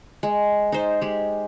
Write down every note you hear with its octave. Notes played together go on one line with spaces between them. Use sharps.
G#3
D#4 C5
G#3 G4